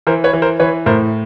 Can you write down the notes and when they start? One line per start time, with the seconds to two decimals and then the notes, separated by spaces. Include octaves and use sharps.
0.07 E3 A#4 C5
0.24 B4 C#5
0.33 E3
0.42 A#4 C5
0.60 E3 B4 C#5
0.86 A2 A#4 C5